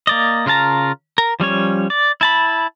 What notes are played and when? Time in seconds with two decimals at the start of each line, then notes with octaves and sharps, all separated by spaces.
0.07 A#3 D5 D#5
0.46 C#3 F4 A#4 A5 A#5
1.18 A#4
1.40 F3 G3 C#4 C#5
1.90 D5
2.21 E4 A5 B5